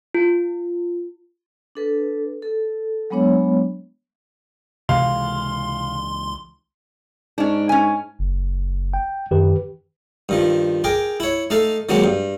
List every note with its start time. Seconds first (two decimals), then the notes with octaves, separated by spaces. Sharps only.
0.14 F4
1.75 D4 A4 B4
2.42 A4
3.10 F#3 G#3 B3 D4 C#5
4.89 C#2 C3 E3 G#3 F5 C6
7.38 G#2 C#4 D4
7.69 C#4 G#5
8.19 F#1
8.94 G5
9.31 F#2 D#3 G4 B4
10.29 G2 D#3 F3
10.84 G#4 A#4 G5 D6
11.20 E4 C#5
11.50 A3 D#4 A4 F5
11.89 D#3 F#3 G#3 A#3 C4
12.04 G2